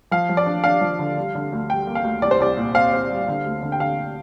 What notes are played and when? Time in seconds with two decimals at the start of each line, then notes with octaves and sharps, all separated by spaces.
0.11 F3 F5
0.29 F3
0.37 D5
0.46 D4
0.64 D4 F5
0.81 F3
0.99 D3
1.17 G3
1.35 D3
1.53 D2
1.69 G3 G5
1.87 A#3
1.95 F5
2.04 D2
2.22 C2 D5
2.31 C5
2.40 C2 D5
2.57 A#2
2.74 C4 F5
2.93 C4
3.10 G3
3.28 D3
3.45 D2
3.62 D3
3.72 G5
3.80 D3 F5